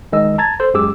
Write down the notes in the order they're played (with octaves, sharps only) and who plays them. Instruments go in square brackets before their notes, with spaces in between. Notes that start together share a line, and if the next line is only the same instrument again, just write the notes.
[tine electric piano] D#3 G#3 D#5 E6
A5 A#5 G#6 A6
A4 C5
F#2 G#3 G4 G#4 D6 E6